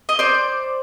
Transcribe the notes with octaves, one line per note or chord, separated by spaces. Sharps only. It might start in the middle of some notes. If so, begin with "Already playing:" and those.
D#5
C5 D5